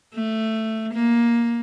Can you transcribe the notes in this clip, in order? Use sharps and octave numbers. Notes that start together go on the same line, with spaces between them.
A3
A#3